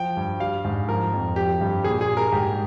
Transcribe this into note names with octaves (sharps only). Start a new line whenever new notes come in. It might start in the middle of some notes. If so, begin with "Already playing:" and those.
Already playing: F3 G5
G2
G3 F5
G#2
F3 A#4
F2
F3 G4
G2
A#2 G#4
G#4
G3
A#4
G#2 G4